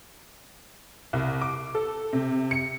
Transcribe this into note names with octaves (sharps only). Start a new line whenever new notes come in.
C2
D6
A4
C3
C#7